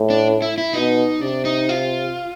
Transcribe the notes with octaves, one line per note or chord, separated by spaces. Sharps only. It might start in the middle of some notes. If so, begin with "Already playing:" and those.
Already playing: A2
D4
E4
E4
B2 D#4
C3 D4
D#4
F4